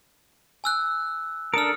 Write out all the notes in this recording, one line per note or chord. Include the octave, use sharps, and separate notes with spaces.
G#5 E6 F#6
D4 A4 A#4 D#6 F6